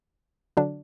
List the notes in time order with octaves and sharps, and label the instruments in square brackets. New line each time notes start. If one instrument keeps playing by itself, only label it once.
[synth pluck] D3 F#3 D4